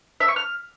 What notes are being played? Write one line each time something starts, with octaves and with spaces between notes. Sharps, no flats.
E5
C#6
F6